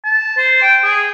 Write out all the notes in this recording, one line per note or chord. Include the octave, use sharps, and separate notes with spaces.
A5
C5
G5
G#4